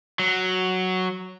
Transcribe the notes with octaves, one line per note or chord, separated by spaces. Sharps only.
F#3